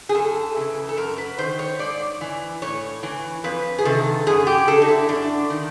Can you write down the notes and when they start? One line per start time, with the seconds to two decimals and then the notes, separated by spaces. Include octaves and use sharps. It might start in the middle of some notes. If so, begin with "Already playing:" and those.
0.09 G#4
0.15 F#2 A4
0.56 C#3 E3
0.89 A4
0.97 F#2 A#4
1.18 B4
1.38 D#3 C5
1.59 C#5
1.79 G#2 D5
2.21 E3
2.62 A2 C#5
3.03 E3
3.44 F2 B4
3.79 G#4
3.85 C3 D#3 A4
4.27 F#2 G#4
4.47 G4
4.68 D3 A4
4.82 D#4
4.88 E4
5.09 F#2 D4
5.50 D#3